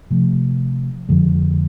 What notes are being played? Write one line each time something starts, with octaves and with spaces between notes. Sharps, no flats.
C3 F3 A3
F2 D3 F3 G#3